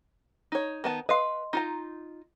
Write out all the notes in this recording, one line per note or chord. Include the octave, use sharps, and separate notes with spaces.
D#4 C#5
D#3 B3 A5
B4 D#5 F5 C6
D#4 F4 A#5